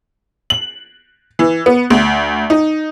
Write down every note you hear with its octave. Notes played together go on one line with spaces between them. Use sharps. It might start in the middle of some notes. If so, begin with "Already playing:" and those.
F#7
E3
B3
D2
D#4